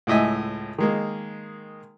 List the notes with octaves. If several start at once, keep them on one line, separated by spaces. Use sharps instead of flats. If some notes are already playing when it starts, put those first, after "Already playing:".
C#2 A2 D#5 E5 G#5
D#3 G#3 A#3